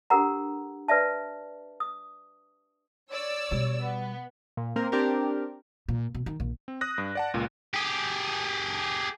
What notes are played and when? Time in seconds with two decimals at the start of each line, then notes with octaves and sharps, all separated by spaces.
0.10 D4 G4 A4 A#4 F#5 A#5
0.88 B4 D5 E5 A5
1.80 D#6
3.11 C#5 D5 E6
3.51 B2 G3
3.82 B3
4.57 A#2
4.76 A#3 C4 A#4
4.92 C4 D4 G4 A#4
5.89 A#2
6.15 B2
6.26 D#3
6.40 A#1
6.68 C4
6.81 D#6 F#6 A#6
6.98 G2
7.15 D5 F#5 A5
7.34 C#2 A#2
7.74 G4 G#4